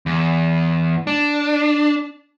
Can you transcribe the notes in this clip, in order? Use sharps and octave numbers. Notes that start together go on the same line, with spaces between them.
E2
D4